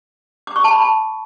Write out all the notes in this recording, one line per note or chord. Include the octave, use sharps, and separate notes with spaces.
D6
C#6
A5
B5
A5